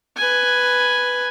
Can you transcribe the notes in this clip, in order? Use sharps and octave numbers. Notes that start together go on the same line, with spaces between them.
B4 G#5